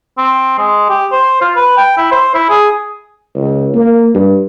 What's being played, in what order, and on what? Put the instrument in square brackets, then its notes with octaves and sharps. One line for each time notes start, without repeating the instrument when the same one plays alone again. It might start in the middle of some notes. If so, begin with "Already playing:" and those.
[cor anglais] C4
G#3
G4
C5
F4
B4
G5
E4
C5
E4
G#4
[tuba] C#2
A#3
G2